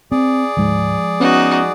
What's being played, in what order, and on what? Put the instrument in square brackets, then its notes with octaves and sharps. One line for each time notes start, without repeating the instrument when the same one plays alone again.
[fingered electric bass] C4 [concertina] G#4 D5
[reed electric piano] D2 G#2 [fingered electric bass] F3 G#3
[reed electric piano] B3 C#4 [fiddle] D#4 F#4